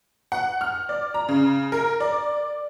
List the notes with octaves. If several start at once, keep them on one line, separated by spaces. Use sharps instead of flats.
F#5
F6
D5
A#5
C#3
A#4
D5